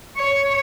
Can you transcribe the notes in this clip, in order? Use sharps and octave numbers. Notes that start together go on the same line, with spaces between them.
C#5